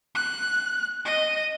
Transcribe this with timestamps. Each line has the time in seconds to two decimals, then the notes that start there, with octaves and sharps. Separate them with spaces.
0.15 F#6
1.05 D#5